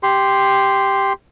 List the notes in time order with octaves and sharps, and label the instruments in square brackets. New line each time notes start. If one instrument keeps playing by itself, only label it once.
[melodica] G4 C6